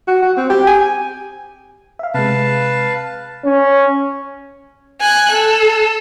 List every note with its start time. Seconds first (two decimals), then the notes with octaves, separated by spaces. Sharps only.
0.07 F#4
0.22 F#4
0.37 C4
0.50 G4
0.67 G#5
1.99 E5 F5
2.14 C3 G#3 B4 F5 A5
3.45 C#4
5.01 G#5 F#6
5.32 A4